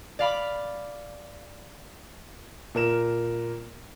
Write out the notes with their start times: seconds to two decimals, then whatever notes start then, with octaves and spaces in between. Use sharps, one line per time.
0.19 D5 F5 B5 D6
2.75 A#2 A#4 E7